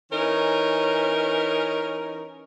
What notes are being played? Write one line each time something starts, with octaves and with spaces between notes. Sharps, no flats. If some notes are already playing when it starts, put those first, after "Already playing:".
E3 C#4 D#4 A#4